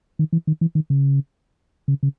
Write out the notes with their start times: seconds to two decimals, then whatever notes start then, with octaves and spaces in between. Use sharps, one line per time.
0.19 D#3
0.33 E3
0.47 D#3
0.61 E3
0.75 D#3
0.90 C#3
1.88 C#3
2.03 C#3